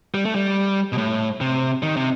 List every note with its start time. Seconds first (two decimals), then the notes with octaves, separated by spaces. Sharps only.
0.14 G3
0.25 A3
0.35 G3
0.92 B2
0.98 A2
1.41 C3
1.83 D#3
1.96 C3